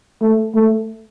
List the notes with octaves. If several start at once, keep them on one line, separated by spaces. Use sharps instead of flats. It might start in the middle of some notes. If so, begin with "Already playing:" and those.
A3
A3